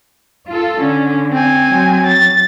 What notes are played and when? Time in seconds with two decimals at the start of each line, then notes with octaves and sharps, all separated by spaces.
0.48 F4 A4
0.80 D3 C#4
1.32 C4 G#5
1.68 F#3
2.06 A6